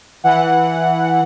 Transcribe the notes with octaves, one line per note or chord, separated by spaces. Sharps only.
E3 F#5